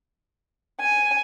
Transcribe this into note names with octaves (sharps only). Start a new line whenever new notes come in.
G#5